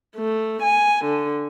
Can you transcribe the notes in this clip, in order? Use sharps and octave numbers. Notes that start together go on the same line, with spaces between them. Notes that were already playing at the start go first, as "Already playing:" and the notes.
A3
G#5
D3